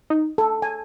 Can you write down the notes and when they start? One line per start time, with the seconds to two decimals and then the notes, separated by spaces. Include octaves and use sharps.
0.10 D#4
0.38 A4
0.62 G#5